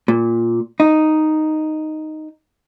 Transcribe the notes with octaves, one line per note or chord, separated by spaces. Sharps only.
A#2
D#4